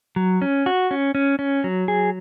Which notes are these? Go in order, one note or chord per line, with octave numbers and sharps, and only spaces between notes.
F#3
C#4
F#4
C#4
C#4
C#4
F#3
G#4